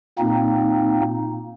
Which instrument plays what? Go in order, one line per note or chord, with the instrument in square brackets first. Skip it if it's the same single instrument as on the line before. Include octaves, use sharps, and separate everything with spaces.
[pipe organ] A#2 A#3 C4 D#4